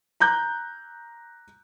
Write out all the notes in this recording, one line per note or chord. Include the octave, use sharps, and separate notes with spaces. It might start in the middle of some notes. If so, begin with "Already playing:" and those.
A#5 F#6 G6